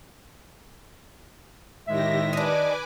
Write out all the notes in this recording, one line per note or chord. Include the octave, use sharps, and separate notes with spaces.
A2 D#3 G#3 G4 E5 A#6
D4 D#4 B4 G#5 D6